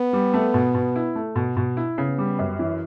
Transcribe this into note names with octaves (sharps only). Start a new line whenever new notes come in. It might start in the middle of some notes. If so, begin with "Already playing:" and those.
Already playing: B3
G3
A3
B2
B2
E4
A3
B2
B2
E4
C#3 B3
G3
F#2
E3